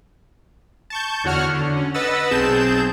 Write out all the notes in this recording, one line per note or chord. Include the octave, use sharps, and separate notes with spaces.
A5 C#6 G6
E2 D3 F#4 C#5 F#5 F6
D3
C#4
B4 D#5 F#5 E6 A6
B1 C4 G#4 A5 G6 E7